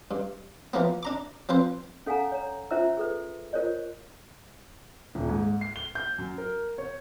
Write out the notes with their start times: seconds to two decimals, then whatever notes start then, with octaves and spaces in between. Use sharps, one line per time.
0.11 G2
0.73 E3 F3 A#3 B3
1.03 D4 A#5 D6
1.49 F3 C4 B4 C5
2.06 C#4 A4 F5 F#5 G#5 A#5
2.32 C#5 A#5
2.71 C#4 F4 C5 E5 A#5 E6
2.97 G#4 A4 B4
3.53 F4 A#4 C5 C#5 D#5
5.15 D#1
5.29 G#2
5.61 C7
5.76 G7
5.95 G6
6.18 F#2
6.38 A#4
6.78 C#5